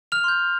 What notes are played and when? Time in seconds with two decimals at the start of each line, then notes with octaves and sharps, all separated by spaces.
0.12 F6 F7
0.24 C6 G6